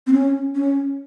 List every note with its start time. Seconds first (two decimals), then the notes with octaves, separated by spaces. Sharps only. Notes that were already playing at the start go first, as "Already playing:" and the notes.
0.07 C4
0.13 C#4
0.55 C#4